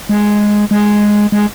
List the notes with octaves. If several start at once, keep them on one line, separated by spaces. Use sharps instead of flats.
G#3
G#3
G#3